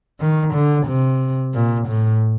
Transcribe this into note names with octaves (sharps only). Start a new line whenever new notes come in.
D#3
D3
C3
A#2
A2